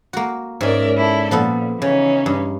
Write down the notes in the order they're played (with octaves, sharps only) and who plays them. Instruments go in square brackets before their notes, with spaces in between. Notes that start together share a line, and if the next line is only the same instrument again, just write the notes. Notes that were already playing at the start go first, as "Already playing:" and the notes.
[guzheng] A#3 F#4
[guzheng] G#2 C#4 [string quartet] A#4 D5 E5
[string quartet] E4 A4 D5
[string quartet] A#2 [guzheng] F3 B3 A4
[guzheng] C#3 [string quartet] E3 C#4 D#4
[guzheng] G2